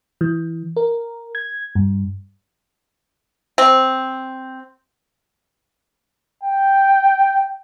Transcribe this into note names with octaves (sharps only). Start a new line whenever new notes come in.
E3
A#4
G#6
G2
C4
G5